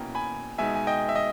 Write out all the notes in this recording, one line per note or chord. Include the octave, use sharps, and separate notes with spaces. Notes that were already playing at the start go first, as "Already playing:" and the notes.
Already playing: B2 A#3 C#4 E4 G5 A#5
G#5 B5
B2 G#3 D#4 E5 G#5
G#5
D#5 G5
E5
D#5